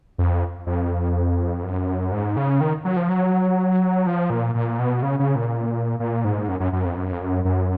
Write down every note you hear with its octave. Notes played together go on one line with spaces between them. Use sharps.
F2
F2
F#2
G#2
C#3
D#3
F#3
F3
F#3
F3
A#2
A#2
B2
C#3
C#3
A#2
A#2
G#2
F#2
F#2
F#2
F2
F#2
F2
F#2
F#2